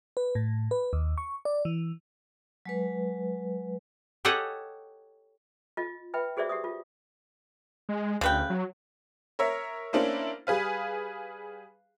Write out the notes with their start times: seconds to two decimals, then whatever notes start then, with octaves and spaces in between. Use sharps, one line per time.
0.17 B4
0.35 A2
0.71 B4
0.93 D#2
1.18 C#6
1.45 D5
1.65 E3
2.65 F#3 G#3 B4
4.25 G4 A4 C#5 D#5 F#5 G#5
5.77 F4 D#5
6.14 B4 E5 G5 B5
6.37 F#4 G#4 C5 D5 E5
6.49 G4 E5 D#6
6.64 F4
7.89 G#3
8.21 D2 C#3 B4 G5
8.50 F#3
9.39 A#4 C#5 E5
9.93 A#3 C#4 D4 E4 C5
10.47 G3 G#4 B4 F5